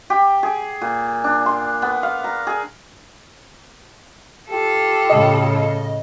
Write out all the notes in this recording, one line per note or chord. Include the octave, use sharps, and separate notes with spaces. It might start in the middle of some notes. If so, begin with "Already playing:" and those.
G4
G#4
A#2
D4
C6
B3
F5
A#5
G#4
F4 G4 A4
A2 C#3 D#5